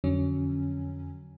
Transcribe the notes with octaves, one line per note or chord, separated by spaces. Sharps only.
F2 D3 F#3 C#4